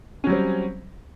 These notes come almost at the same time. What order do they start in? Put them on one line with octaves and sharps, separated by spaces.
C#4 F#3 G3 C4